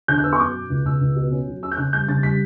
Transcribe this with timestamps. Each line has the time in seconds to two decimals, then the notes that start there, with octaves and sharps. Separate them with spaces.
0.08 D3 G6
0.18 F#6
0.24 B3 E6
0.33 C#6
0.40 F#2 D6
0.54 B2
0.70 C#2
0.85 C#2 E6
1.01 C#2
1.16 B2
1.31 C#4
1.47 F#3
1.62 C#4 E6
1.72 G6
1.77 C#3 F#6
1.93 G3 G6
2.08 C#3 A6
2.23 G3 B6